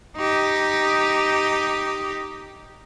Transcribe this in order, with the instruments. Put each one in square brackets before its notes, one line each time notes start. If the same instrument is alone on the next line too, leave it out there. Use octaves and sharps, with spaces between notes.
[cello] D#4 G4